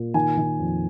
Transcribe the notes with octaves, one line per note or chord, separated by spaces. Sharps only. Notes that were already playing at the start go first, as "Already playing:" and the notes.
Already playing: A#2
D#3 G#5
D#3
F2